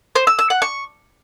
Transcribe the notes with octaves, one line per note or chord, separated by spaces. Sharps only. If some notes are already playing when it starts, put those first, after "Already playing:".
C5
E6
E6
F#5
C#6